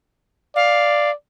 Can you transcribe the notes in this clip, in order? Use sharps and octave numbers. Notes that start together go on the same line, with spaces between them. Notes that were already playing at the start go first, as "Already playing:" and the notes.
D5 F5